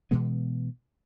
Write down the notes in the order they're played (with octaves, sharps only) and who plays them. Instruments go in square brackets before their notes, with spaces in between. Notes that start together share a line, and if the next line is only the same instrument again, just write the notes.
[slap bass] B2 E3 G#3 B3